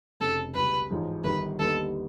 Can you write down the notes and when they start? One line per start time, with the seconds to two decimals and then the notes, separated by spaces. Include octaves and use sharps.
0.20 F1 F2 C#3 A4
0.55 C#2 B2 G3 B4
0.90 A1 G#2 F3 G#3
1.24 G1 G2 D#3 G3 B4
1.59 D#2 D3 G3 B3 D#4 A4